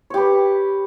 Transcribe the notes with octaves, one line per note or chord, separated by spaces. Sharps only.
G4 B4 C#5